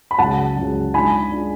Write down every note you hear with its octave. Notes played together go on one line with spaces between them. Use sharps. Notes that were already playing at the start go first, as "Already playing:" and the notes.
B5
C#2 C#3 F#3 F#5 A5
C#2 C#3 F#3
G#2 G#3 D4 F4 G#5 B5
G#3 D4 F4